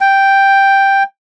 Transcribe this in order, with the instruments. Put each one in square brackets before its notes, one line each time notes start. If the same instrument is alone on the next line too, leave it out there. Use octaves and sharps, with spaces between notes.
[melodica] G5